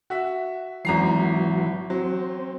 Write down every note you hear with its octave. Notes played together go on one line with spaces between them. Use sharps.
F#4 E5
G#1 E3 F#3 A#5 C7
F#3 C4